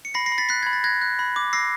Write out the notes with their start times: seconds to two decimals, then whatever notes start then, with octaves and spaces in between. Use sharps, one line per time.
0.05 C#7
0.14 B5 A#6 C7
0.26 A#6 C7
0.32 B5
0.38 A6 B6
0.49 F#6 A6 B6
0.63 B5 G#6
0.73 A6
0.84 F#6 G#6 A#6
1.02 F#6
1.19 B5
1.36 D6
1.53 E6 A#6 C7